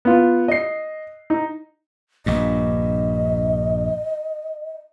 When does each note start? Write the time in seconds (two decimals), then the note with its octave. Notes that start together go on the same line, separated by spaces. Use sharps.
0.05 B3 F4
0.48 D#5 C7
1.30 D#4
2.26 A#1 G2 D#5